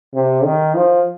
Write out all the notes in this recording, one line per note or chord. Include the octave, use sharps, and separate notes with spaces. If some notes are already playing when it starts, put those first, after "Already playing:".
C3
D#3
F3